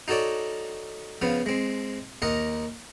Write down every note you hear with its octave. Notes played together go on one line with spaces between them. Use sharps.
D#4 F#4 A4 C#5 D5
C#3 F3 B3
G#3 C4
D#2 A#4 D#5 F#5 A#5